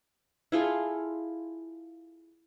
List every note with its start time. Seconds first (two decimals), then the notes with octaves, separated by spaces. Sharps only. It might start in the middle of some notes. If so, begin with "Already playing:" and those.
0.52 E4 F4 G#4 A4